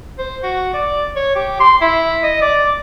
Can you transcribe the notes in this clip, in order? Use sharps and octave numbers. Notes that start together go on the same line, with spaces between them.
C5
F#4
D5
C#5
G4
C6
E4
D#5
D5